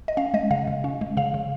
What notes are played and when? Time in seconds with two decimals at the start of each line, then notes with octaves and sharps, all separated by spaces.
0.08 D#5
0.17 C#4 F5
0.34 G#3 D#5
0.51 C#3 F5
0.67 C#3
0.84 C#4
1.01 G#3
1.17 C#3 F5
1.34 C#3